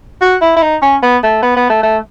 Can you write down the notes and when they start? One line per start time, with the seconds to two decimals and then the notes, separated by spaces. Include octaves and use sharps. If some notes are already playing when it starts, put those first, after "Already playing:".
0.22 F#4
0.42 E4
0.57 E4
0.62 D#4
0.82 C#4
1.03 B3
1.23 A3
1.43 B3
1.56 B3
1.70 A3
1.83 A3